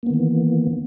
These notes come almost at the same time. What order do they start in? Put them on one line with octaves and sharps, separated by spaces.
A#3 B3 D#3 E3